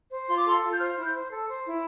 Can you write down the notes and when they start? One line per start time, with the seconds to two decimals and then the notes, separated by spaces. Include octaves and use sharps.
0.10 C5
0.27 F4 C6
0.37 D6
0.45 A4 C6
0.62 F4
0.73 G6
0.79 C5 F6
0.95 E4 F6
1.04 G6
1.13 C5
1.29 A4
1.47 C5
1.65 E4